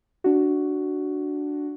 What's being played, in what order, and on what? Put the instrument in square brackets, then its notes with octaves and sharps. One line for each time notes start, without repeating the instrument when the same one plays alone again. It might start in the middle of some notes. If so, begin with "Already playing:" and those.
[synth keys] D4 F#4